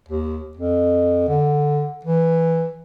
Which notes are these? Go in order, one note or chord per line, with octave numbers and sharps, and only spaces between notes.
D#2
F2
D3
E3